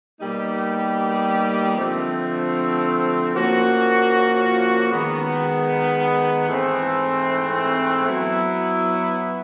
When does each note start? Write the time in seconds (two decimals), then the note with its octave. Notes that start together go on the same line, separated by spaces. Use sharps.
0.20 B2 G3 A#3 D#4 G4
1.77 D3 F3 A3 C4
3.34 A#2 F3 A#3 C#4 F#4
4.90 D#3 G#3 B3
6.47 G#2 E3 A3 C4
8.05 F#3 B3 E4